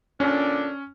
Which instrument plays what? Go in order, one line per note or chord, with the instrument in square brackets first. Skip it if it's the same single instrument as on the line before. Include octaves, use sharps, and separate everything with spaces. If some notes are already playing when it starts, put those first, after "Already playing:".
[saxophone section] A#2 D3 D4 [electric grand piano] C#4